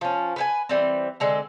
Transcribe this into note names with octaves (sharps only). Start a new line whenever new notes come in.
F3 C#4
B4 C5 G#5
E3 G3 C4
D3 G#3 C4